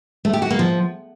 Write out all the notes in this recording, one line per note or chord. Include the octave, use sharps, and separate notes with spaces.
A3
G4
F#4
A#3
F3